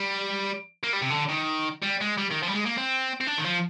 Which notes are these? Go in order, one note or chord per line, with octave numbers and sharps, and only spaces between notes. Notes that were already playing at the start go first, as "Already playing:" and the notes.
Already playing: G3
A#3
G3
C3
D3
D#3
G3
G#3
G3
D#3
F3
G3
G#3
A#3
C4
C4
D4
D#3
F3